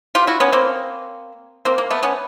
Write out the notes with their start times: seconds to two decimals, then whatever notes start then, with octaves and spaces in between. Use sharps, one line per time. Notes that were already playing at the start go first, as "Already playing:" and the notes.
0.15 F4 G4
0.27 E4 F#4
0.40 B3 C#4
0.53 A#3 C4
1.65 A#3 C4
1.78 A#3
1.90 A3 B3
2.03 B3 C#4